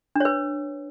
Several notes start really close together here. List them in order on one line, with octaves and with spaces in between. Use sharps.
D4 C#5 B4